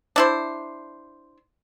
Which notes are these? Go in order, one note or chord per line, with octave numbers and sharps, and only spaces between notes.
D4 E4 C5